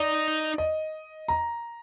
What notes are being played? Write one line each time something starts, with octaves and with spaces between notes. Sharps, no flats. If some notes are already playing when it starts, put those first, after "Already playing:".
Already playing: D#4 D5
D#5
A#5